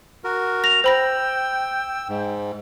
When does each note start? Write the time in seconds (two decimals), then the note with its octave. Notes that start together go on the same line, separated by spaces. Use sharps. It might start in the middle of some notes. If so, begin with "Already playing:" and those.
0.24 F#4 A#4
0.64 A#6 F7
0.84 C5 G5 B5 E6 A#6
2.09 G#2